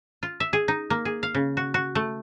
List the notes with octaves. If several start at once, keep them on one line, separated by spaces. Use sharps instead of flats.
F4
E5
G#4
D#4
A#3
G#4
F5
C#3
F#4
F#4
A3